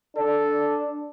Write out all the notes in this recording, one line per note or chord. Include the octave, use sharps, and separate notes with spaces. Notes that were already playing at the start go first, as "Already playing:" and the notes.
D4 A4